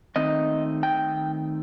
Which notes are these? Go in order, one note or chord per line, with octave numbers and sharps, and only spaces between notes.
D#3 A3 C4 D#4 D#5
G5